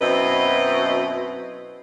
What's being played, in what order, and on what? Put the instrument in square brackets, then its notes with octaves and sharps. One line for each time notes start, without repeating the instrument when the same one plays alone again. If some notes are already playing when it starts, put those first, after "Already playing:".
[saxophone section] F#2 B2 C4 E4 B4 D#5